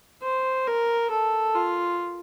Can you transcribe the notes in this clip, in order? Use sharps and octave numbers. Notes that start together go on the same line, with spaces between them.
C5
A#4
A4
F4